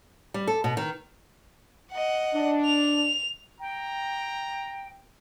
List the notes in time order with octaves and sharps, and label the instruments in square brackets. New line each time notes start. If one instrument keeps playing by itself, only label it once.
[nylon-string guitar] G3
A4
B2
D#3
[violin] D#5 F#5
[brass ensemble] D4
[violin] F7
[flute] G5 [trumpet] A#5